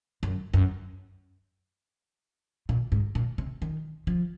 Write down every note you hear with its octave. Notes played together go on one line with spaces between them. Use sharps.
F#2
F#2
A#2
G#2
A#2
C3
D#3
F3